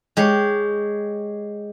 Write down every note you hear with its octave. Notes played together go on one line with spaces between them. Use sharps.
G#3 G4 C#5